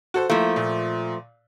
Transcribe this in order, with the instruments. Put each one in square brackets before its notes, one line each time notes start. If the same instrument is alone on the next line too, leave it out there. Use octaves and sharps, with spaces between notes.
[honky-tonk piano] F#4 A4 C5
[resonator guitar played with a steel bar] F3 A3 [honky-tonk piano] A#3 E4
[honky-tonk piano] A#2